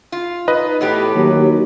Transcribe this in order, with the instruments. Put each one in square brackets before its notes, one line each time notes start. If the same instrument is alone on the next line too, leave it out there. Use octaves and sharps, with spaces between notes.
[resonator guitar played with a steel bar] F4
[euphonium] D#4 [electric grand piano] B4 D#5
[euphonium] A2 [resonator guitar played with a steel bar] E3 B3 G4
[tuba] D#2 [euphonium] F#3